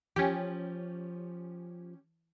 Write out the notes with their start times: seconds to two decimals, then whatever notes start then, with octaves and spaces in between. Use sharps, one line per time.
0.16 F3 C#4 G4